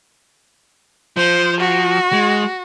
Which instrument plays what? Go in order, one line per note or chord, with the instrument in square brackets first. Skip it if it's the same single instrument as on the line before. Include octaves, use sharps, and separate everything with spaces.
[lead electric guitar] F3 [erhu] C5
[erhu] F#4
[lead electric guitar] G#3